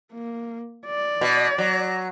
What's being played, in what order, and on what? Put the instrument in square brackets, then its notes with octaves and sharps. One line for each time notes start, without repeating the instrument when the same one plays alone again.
[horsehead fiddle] A#3
D5
[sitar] B2
F#3